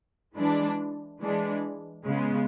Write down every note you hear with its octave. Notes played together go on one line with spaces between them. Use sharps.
E3 G#3 D4
E3 G#3 D4
C#3 G#3 B3